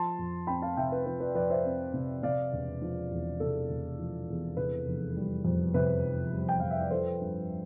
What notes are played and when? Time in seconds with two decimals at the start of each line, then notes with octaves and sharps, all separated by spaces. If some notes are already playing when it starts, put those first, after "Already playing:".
Already playing: F3 A5 C6
0.19 F2
0.47 C4 G5 B5
0.62 F5 A5
0.77 C3 E5 G5
0.92 B4
1.06 F3 B4
1.20 B4 D5
1.35 F2 B4 D5
1.50 C5 E5
1.65 C4
1.94 C3
2.23 C3 D5 F5
2.53 E1
2.81 F3
3.11 E2
3.40 C3 A4
3.69 E1
3.99 F3
4.29 E2
4.57 C3 B4
4.86 F1
5.16 G3
5.44 F2
5.74 C3 B4
6.04 F1
6.32 G3
6.49 G5
6.60 F2 F5
6.71 E5
6.81 D5
6.91 F3 A4 C5
7.21 G2